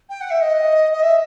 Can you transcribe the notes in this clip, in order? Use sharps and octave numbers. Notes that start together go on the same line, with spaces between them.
G5
F#5
E5
D#5
D#5
E5